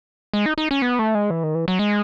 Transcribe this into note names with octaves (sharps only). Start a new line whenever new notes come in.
G#3
D#4
D#4
C#4
B3
A3
G#3
E3
D#3
E3
F#3
G#3